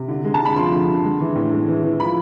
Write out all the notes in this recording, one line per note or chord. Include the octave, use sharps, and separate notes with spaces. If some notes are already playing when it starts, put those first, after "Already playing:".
Already playing: C3
D3
G#3
A5
D3 B5
F3 C6
D3
D3
G#3
E3
A2
G#3
E3
E3
F3 B5